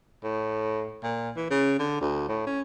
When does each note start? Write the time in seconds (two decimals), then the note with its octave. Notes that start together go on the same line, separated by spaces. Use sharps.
0.24 A2
1.03 A#2
1.37 E3
1.50 C#3
1.79 D3
2.01 D2
2.29 A2
2.47 C#4